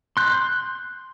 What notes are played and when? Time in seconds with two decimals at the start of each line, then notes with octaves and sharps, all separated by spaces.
0.17 C6 F#6 G6